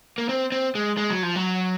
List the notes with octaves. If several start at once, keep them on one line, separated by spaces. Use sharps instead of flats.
A#3
C4
C4
G#3
G#3
F#3
F3
F#3